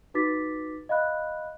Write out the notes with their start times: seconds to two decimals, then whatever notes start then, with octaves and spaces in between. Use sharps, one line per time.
0.14 D#4 F#4 B4 D6 A6 B6
0.89 D#5 F5 B5 F#6